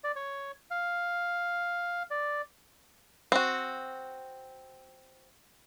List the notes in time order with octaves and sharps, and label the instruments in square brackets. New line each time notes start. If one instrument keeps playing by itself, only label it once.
[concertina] D5
C#5
F5
D5
[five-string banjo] C4 F#4